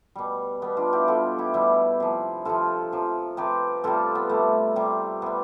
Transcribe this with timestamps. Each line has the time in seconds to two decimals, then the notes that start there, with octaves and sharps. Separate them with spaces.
0.15 B2 G3
0.62 B2 G3 B3
0.77 D4 F4
0.93 E4 G4
1.08 B2 G3 F4 A4
1.39 E4 G4
1.54 B2 G3 E4 G4
2.00 C3 F3
2.45 C3 F3 F4 A4
2.92 C3 F3
3.37 C3 F3 G4 B4
3.84 C3 G3 F4 A4
4.15 B3
4.30 C3 G3 A3
4.76 C3 G3
5.22 C3 G3 B3